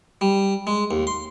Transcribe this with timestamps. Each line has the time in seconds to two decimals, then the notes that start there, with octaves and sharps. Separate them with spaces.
0.21 G3
0.67 G#3
0.91 D#2
1.07 C6